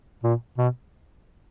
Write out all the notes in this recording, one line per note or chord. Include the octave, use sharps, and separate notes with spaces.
A#2
B2